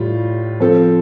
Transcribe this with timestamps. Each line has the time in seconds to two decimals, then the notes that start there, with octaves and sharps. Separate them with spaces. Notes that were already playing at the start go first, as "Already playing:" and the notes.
Already playing: A2 G3 F4
0.60 F3 C4 A4